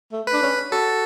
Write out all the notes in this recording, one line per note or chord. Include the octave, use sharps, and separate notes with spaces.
A3
B4
D4
C#4
F#4 A4